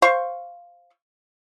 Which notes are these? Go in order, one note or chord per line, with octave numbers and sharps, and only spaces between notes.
C5 F5 C#6